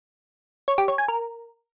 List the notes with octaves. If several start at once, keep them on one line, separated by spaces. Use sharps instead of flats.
C#5
G4
C#5
G#5
A#4